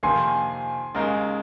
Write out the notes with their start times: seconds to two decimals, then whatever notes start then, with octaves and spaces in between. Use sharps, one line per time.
0.03 F2 C3 D#3 A#3 G#5 C6
0.95 D#2 C#3 G#3 D#4 A#4